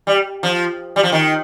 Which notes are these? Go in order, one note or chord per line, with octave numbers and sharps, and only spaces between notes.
G3
F3
G3
F3
D#3